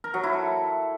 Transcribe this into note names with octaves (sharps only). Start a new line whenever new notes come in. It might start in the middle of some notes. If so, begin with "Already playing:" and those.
A#4
F#3
E4
A4